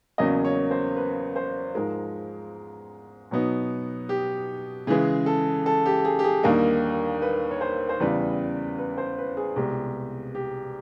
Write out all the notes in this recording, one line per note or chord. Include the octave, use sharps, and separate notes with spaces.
E2 C#3 F#3 A#3 C#4 D#5
C#5
C5
B4
C5
G#2 F3 G#3 A#4
B2 F#3 B3 D#4
G4
C#3 E3 G#3 G#4
A4
A4
G4
G#4
G4
G#4
D#2 D3 G3 A#3 D#4 A#4
B4
C#5
C5
C5
E2 C#3 E3 G3 B4
B4
C5
B4
G#4
C2 B2 G#3 G4
G4